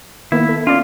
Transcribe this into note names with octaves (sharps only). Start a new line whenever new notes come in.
D#3 A#3 B3 E4
A4
C#4 F4 D5